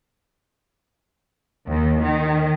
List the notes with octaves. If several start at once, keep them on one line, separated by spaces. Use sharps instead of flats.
D#2
D#3